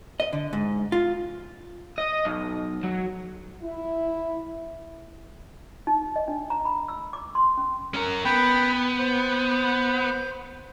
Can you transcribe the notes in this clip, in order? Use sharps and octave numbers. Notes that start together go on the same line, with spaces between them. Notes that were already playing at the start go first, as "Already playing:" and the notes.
D#5
D3
G#2
F4
D#5
B1
F#3
E4
D#4
D#5
D4
A#5
B5
E6
D6
C6
C#4
C#4 A#4
B3 G5 B5
C5